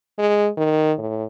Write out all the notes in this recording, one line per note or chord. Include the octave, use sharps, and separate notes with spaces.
G#3
D#3
A2